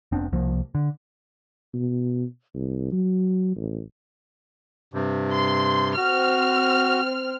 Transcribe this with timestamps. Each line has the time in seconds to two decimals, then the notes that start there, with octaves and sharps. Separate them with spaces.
0.12 F1 B3 C4 D4
0.32 C2 F3 A#3
0.75 D3
1.73 B2
2.55 C2
2.92 F#3
3.56 A1
4.93 G2 C3
5.32 C6
5.97 C4 F#4 F6